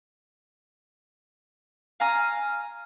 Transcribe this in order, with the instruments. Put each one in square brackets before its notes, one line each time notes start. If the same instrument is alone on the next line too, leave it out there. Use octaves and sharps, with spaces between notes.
[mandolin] F5 G#5 A#5 F6